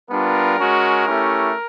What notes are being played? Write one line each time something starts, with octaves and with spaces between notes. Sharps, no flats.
G3 B3 D4 F4 A#4
G#3 C#4 F#4
A3 C#4 E4 G4